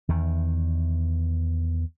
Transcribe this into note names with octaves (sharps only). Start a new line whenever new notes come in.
E2 D#3